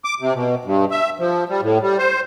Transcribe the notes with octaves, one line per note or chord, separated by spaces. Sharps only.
D6
C3
B2
G2
E5
F3
G3
A2
G3
C5